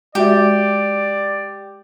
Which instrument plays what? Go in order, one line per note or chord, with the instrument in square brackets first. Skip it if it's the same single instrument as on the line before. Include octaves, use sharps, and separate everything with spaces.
[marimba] G#3 F#4 E5 [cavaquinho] G4 [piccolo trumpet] D5